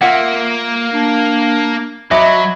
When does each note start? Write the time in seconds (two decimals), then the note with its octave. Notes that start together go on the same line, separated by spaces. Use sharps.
0.01 A#3 F4 E5 F#5
0.93 D4
2.11 F#3 F#4 D#5 E5 B5 D6